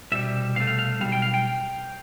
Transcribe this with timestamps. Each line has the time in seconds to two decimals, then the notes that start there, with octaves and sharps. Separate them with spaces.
0.12 C2 B2 G3 E5
0.56 C2 B2 A3 F5
0.67 F5
0.79 F5
1.00 B1 B2 G3 F5
1.12 G5
1.22 F5
1.34 G5